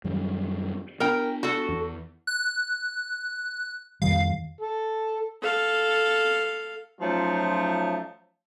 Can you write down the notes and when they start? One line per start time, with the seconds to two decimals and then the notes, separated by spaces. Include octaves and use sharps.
0.04 F#2 D#3 G3
1.00 B3 D4 A#4 G5
1.43 F#4 A4
1.69 E2
2.27 F#6
4.02 F2 D#3 G3 F5
4.61 A4
5.42 A4 F5
7.00 F3 F#3 A3 C#4 D#4 F4